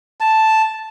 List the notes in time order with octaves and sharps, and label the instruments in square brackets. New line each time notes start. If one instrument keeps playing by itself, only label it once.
[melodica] A5